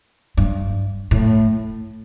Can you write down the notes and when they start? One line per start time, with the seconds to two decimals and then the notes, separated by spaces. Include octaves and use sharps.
0.37 G2
1.11 A2